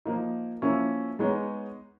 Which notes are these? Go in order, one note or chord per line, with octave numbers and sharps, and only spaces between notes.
F3 A#3 D#4
F3 A#3 C#4 E4
G#3 B3 D#4 G#4 C#5